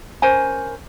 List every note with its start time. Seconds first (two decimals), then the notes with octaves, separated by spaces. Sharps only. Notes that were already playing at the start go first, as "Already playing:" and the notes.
0.22 C#4 A#4 C5 G#5